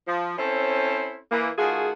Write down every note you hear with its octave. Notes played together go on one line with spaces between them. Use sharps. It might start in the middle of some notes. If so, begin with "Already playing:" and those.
F3
C4 C#4 E4 A4 C5 C#5
E3 A#3
D#3 A3 F4 F#4 G#4